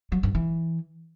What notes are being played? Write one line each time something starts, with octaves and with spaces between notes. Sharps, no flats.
F#3
G2
E3